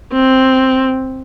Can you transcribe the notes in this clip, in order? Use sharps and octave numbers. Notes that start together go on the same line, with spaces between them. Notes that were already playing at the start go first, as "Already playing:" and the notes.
C4